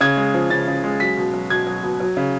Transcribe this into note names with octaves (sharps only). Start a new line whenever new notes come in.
C#3 G#6
G#3
F3
C#3 A6
C#3
G#3
F#3 B6
B2
F#3
B2 G#6
F#3
B2
F#3
C#3